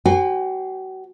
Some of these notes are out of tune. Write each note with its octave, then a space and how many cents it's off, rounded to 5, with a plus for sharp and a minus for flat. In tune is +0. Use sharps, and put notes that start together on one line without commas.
F#4 +35 C5 +0 G#5 -35